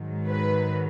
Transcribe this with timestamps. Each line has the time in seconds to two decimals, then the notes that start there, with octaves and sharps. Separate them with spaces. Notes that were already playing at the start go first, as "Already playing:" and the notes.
Already playing: G#2 D#3 F#3
0.28 B4